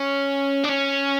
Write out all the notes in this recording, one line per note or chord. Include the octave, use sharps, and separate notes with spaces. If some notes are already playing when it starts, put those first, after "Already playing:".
Already playing: C#4
D4
C#4